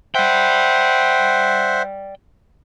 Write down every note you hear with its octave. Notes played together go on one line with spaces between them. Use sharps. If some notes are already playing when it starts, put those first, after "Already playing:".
C5 D5 E5 F#5 G5